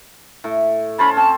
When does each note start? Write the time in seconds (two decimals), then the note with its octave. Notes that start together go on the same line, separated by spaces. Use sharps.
0.44 A2
0.99 C#4 C5 A5 B5
1.17 C4 A5